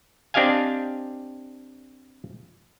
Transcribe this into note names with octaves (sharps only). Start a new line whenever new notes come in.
C4 D4 G4 D#5 F5 G#5